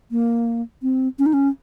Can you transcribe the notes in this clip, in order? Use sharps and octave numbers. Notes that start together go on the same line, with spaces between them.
A#3
C4
C#4
D#4
C#4